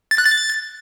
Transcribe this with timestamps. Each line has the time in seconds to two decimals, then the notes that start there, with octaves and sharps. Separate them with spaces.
0.11 A6
0.18 F#6
0.25 A6